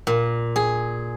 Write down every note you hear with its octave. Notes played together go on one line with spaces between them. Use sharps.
A#2
G#4